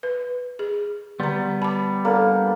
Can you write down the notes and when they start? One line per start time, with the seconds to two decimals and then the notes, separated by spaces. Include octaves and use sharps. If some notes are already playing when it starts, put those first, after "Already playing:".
0.03 B4
0.59 G#4
1.20 D3 G3 B3 A#5
1.62 A5 B5 D6
2.05 A#3 D4 A4 F#5